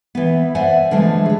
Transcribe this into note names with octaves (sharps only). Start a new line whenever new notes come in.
E3 B3
C5 D5 E5 F#5 G#5
D3 E3 F3 G#3 A3
G#4 C#5